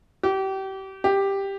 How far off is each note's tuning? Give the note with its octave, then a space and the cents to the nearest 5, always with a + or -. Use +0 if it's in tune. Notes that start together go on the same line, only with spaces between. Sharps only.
G4 -30
G4 +5